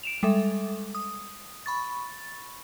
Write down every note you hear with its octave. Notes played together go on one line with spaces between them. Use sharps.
D7 E7 F7
G3 G#3 A4 E5
D#6
B5 C#6 A6